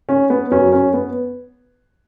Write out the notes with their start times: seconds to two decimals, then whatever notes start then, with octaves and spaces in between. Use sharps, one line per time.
0.09 C#4
0.30 B3
0.51 F#2 F#3 C#4
0.73 C#4
0.94 B3